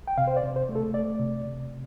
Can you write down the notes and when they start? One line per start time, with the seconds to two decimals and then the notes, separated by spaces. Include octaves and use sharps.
0.08 G5
0.18 C3 F5
0.27 C5
0.37 D5
0.43 C3
0.56 C5
0.69 A3
0.75 A4
0.94 A3 D5
1.20 C3
1.46 C3